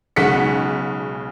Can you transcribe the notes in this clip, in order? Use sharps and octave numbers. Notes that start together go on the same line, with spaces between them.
B1 C#3 G#3 F#5 B6 C#7